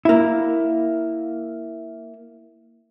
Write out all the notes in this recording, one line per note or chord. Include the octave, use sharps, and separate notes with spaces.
A#3 E4